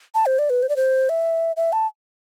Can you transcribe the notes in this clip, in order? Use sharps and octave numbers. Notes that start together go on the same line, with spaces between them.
A5
C5
D5
B4
C5
D5
C5
E5
E5
A5